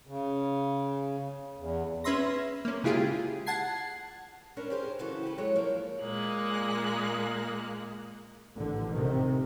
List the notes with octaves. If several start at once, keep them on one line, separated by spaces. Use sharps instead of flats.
C#3
E2
C#4 B4 E5 C6 A#6
A#3 C#4
C#3 G#3 E4 F4 G4 G#4
F#5 A5 G#6 C7
C#4 D4 G4 A#4 B4
G4 G#4 A#4 C5
C#3 E3 C#4 F#4 A4 C5
G4 B4
F#3 G#3 A4 C#5
F3 A#3 D5
A#2 G#3 A#3 F#6
A1 D3
C3 D#3